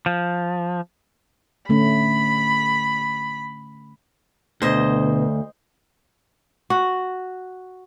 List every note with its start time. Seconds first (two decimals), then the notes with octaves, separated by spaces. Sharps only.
0.06 F3
1.69 D3 A3 C#4 B5
4.62 D2 B2 D3 B3 C5 D#5
6.70 F#4